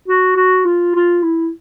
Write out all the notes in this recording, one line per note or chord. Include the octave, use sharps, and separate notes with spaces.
F#4
F#4
F4
F4
E4